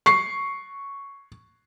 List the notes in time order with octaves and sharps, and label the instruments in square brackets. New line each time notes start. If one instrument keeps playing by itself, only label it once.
[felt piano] C#6 C7